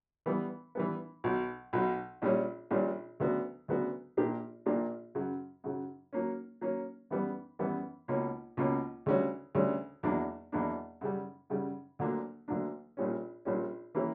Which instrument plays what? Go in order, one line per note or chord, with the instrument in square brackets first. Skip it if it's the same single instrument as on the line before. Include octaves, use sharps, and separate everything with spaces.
[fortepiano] E3 G3 B3
E3 G3 B3
B1 B2 F#3
B1 B2 F#3
A#1 A#2 G3 C#4
A#1 A#2 G3 C#4
D2 C#3 F#3 B3 F#4
D2 C#3 F#3 B3 F#4
A#1 A#2 A#3 D4 G4
A#1 A#2 A#3 D4 G4
F#2 C#3 F#3
F#2 C#3 F#3
F#3 A#3 C#4
F#3 A#3 C#4
F#2 E3 G3 B3
F#2 E3 G3 B3
C#2 B2 A#3 C#4
C#2 B2 A#3 C#4
D2 C#3 G3 C#4 F#4
D2 C#3 G3 C#4 F#4
E2 B2 F#3 A#3 D4
E2 B2 F#3 A#3 D4
F#2 C#3 G3
F#2 C#3 G3
D2 D3 F#3 A#3 D4
D2 D3 F#3 A#3 D4
A#1 A#2 G3 C#4
A#1 A#2 G3 C#4
E3 A#3 C#4 E4 G4